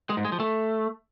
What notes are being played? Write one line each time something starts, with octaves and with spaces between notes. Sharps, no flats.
G#3
G#2
G#3
F3
A3